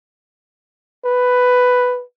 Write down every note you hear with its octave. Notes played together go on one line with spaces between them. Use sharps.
B4